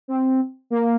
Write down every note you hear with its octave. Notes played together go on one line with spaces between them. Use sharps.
C4
A#3